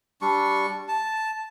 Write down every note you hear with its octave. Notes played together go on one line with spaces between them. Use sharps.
G3 D4 C#6
A5